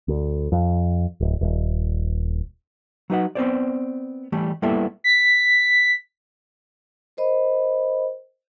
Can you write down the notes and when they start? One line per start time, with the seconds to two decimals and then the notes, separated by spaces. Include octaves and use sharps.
0.08 D2
0.52 F2
1.20 D1
1.41 D#1
3.10 F#3 D#4 B4 F#5
3.35 B3 C4 C5 D5
4.32 E3 G3 A3
4.62 G3 A#3 B3 E4 A4 E5
5.04 B6
7.17 A#4 C5 D#5 B5